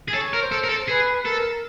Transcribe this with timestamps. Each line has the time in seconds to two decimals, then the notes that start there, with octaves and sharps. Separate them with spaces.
0.08 G#4
0.14 A4 C#5
0.33 A#4
0.39 C#5
0.42 C5
0.52 A4
0.63 A#4
0.69 A4
0.88 G#4 B4
1.25 A4 A#4